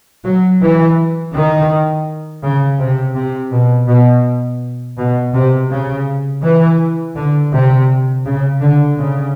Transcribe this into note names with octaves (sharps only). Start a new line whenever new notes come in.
F#3
E3
D#3
C#3
C3
C3
B2
B2
B2
C3
C#3
E3
D3
C3
C#3
D3
C#3